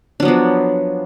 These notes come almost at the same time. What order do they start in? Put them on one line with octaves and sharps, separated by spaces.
D4 F#3 B3 F3